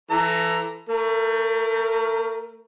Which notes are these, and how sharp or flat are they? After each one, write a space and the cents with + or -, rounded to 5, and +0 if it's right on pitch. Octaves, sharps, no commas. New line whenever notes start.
E3 +25 A4 +0 A#5 +0
A3 +35 A#4 +0